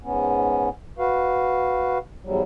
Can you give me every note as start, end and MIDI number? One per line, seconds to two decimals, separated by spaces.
0.04 0.69 44
0.04 0.69 59
0.04 0.69 61
0.98 1.98 66
0.98 1.98 71
0.98 1.98 77
2.24 2.43 40
2.24 2.43 44
2.24 2.43 54
2.24 2.43 55